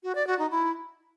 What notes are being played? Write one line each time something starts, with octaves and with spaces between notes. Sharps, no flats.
F#4
D5
F#4
D#4
E4